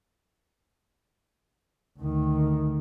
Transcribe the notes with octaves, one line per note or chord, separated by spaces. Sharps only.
D2 D#3